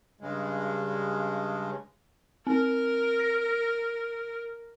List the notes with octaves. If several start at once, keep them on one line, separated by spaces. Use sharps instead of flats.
G2 C#3 G#3
C4 A#4
A#6